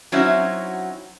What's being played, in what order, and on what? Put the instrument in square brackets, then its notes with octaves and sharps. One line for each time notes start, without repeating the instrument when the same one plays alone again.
[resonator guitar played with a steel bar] F#3 C4 C#4 D#4 E4 F#4